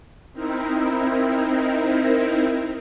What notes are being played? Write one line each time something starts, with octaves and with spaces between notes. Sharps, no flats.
C4 D#4 E4 A#4